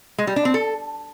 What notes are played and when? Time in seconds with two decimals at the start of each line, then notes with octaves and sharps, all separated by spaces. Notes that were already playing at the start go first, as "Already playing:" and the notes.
0.18 G#3
0.27 G3
0.36 D4
0.45 C4
0.54 A4